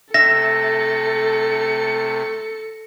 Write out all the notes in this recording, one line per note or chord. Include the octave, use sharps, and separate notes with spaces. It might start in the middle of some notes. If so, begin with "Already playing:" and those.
C3 A3 A4 E5 A#6 C#7